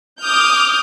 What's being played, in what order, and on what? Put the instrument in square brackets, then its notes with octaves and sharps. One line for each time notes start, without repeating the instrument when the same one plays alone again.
[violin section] D6 D#6 F6 G6